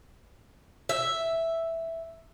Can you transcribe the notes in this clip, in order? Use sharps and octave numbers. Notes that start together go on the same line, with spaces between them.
E5